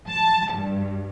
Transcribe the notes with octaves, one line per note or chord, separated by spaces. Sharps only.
A5
G2